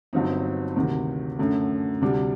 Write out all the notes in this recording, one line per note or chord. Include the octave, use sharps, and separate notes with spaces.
G1 G2 F#3 C4 D#4
D2 C3 D#3
F#2 D3 A3
D2 C3 G3 D4